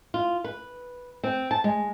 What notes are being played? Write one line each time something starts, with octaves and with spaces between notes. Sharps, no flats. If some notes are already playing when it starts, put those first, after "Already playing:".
F4
B4
C4
A5
G#3